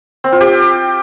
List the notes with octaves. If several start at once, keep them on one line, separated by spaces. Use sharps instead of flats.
C4
F4
G4